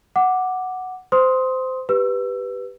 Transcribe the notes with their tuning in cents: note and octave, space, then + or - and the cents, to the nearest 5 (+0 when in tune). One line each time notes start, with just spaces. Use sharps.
F#5 +0 D6 +0
C5 -20 C6 +0 D#6 +20
G4 +0 B4 +0 E6 +20